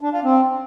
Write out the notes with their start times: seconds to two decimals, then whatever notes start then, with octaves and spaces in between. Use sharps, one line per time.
0.01 D4
0.13 F4
0.24 C4